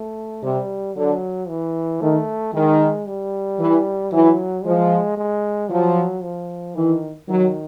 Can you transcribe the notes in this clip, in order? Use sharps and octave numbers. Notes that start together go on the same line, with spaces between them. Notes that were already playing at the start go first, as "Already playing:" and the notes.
Already playing: A3
C3 G3
D3 F#3
E3
D#3 A3
D#3 G#3
G3
E3
E3 F#3
F3 G#3
G#3
F3 F#3
F3
D#3 E3
D#3 F#3